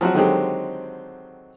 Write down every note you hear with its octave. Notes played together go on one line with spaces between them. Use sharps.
F3 F#3 C4 F#4
D3 D#3 F#3 G#3 C4 G4